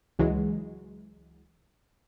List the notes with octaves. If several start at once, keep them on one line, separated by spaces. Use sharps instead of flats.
C#2 E3 F#3 G#3